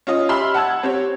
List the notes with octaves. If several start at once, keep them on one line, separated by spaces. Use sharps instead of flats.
C#4 F4 D#5
G4 E5 B5 C6 E6 F6
F#5 A5 E6 G#6
C4 G4 C#5